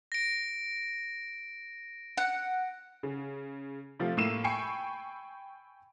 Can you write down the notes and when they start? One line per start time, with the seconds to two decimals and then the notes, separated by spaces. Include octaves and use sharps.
0.12 A#6 D7
2.17 F#5
3.03 C#3
3.99 C3 F3 A3 F4
4.17 A2 A#3 E6 C7 D#7 E7
4.44 G5 G#5 B5 C#6 C7 C#7